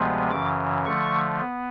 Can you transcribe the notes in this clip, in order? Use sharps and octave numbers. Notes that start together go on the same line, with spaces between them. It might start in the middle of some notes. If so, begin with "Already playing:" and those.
Already playing: D2 C3 F3 G#3 B3
F#2 C#3 E3 D6
D3 F3 A3 C#6
B3